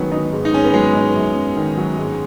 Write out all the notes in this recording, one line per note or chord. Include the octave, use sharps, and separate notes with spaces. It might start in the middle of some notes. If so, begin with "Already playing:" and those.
Already playing: D#3 F#3 G#3 B3 C#4
D#4
G#2
D#4
G#2 C#4
B3
F#3 G#3
D#4
F#2
F#2
D#3
F#3
G#2